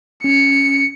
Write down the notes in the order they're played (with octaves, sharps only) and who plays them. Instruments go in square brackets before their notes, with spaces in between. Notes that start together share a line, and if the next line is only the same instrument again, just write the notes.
[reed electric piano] C#4 [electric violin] C#7